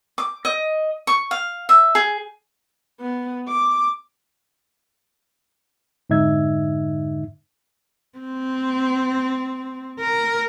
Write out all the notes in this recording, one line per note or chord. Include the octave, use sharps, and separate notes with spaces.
D6
D#5
C#6
F5
E5
G#4
B3
D6
F2 G#2 D3 D#4 E5 G#6
C4
A#4